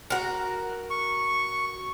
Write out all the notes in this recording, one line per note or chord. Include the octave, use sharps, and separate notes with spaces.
F#4 A#4
C#6